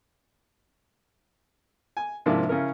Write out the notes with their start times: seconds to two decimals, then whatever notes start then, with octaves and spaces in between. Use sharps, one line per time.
1.97 G#5
2.26 G#2 C3 F3 A#3 D4 E4
2.49 C#3 C#4 E4 A#4